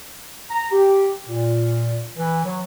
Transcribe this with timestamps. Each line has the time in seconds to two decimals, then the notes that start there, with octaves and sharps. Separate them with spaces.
0.51 A#5
0.72 G4
1.28 A#2
2.18 E3
2.45 F#3